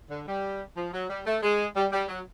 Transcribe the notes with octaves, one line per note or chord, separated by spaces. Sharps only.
D3
G3
F3
F#3
G3
A3
G#3
G3
G3
F#3